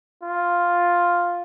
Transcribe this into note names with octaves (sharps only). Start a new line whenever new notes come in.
F4